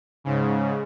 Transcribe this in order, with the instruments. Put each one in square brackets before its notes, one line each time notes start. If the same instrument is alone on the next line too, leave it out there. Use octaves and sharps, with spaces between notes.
[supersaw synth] G#2 C#3